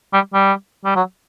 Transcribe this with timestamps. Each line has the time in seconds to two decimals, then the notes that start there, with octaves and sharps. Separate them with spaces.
0.13 G3
0.34 G3
0.85 G3
0.96 F#3